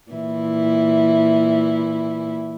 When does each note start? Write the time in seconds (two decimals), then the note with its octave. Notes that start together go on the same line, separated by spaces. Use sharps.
0.12 A#2 E3 E4